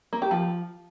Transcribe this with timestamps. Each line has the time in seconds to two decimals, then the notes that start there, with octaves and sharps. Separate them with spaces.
0.13 A#3
0.22 G4
0.31 F3